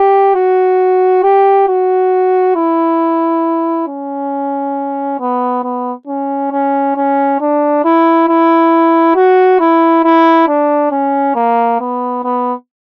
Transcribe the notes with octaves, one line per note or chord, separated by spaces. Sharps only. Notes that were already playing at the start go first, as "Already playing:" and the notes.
Already playing: G4
F#4
G4
F#4
E4
C#4
B3
B3
C#4
C#4
C#4
D4
E4
E4
F#4
E4
E4
D4
C#4
A#3
B3
B3